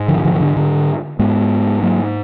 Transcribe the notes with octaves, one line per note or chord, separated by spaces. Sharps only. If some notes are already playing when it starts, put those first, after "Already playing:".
Already playing: G#2
D3 F3
D#3
D3 F3
D#3
D3
D3
G#2 G#3 B3
F#3 A#3